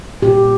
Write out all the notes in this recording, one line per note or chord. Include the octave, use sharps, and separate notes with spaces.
A#2 G4